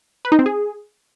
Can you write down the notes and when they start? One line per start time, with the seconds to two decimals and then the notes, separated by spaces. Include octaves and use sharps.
0.25 B4
0.32 D#4
0.39 C4
0.46 G#4